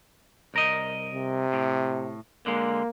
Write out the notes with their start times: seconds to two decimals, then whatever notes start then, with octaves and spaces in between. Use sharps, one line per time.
0.54 C2 A#4 D#5
1.15 C3
1.53 A2
2.46 D3 G#3 A#3